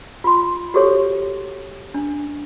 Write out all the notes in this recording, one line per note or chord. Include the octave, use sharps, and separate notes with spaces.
F4 C6
F#4 G4 A4 C#5
D4